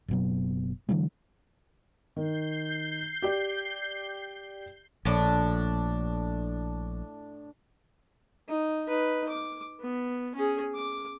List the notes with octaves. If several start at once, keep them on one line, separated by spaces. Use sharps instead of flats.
F#1 B2 F#3
D3 E3 F#3 G#3
D#3 G6 C7
G4 D5
A#1 A2 D4
D#4
D#4 B4
D6
B3
C#4 G#4
D6